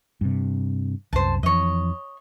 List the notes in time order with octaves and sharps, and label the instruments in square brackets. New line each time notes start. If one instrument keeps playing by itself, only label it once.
[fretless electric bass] G2 C3
[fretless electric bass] C2 F#2 [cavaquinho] C5 A5
[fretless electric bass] F2 E3 [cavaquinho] C#5 D#5